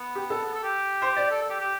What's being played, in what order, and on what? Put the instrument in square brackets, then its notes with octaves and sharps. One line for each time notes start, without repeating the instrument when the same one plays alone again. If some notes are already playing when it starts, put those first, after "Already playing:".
Already playing: [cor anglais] B3
[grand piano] G4
A4
[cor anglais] B3
A4
G4
[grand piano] C5
D5
[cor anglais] A4
A4
G4
G4